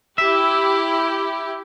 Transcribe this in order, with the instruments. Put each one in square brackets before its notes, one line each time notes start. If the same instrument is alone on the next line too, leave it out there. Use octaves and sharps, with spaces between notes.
[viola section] E4 G4 [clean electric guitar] E5